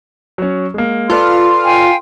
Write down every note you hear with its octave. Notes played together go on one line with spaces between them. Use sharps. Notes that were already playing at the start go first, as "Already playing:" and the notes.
F#3 C#4
G#3 A#3
F4 A4 B4 D5 C6
F5 G5 G#5